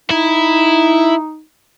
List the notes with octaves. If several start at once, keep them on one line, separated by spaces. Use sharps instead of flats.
D#4 E4